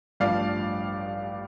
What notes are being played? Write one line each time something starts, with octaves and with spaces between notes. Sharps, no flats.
A1 G2 F3 D5 F5